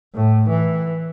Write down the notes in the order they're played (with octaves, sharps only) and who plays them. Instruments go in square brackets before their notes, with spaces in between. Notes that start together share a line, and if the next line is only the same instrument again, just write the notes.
[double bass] A2
E3